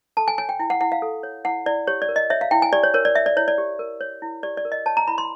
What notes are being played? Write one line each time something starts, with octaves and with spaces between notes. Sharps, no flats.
A4 A5
G#5
C#5 G#5
G5
E4 G5
F#5
E4 F#5
F5
A4
C#5
E4 F#5
E4 D5
G4 C#5
D5
A#4
D#5
C#5 E5
F5
E4 G5
G#5
G4 D5
C#5
A#4 C#5
D5
C#5 E5
D5
E4 C#5
D5
G4
A#4
C#5
E4
G4 D5
D5
A#4
D#5
C#5 A5
A#5
E4 B5
C6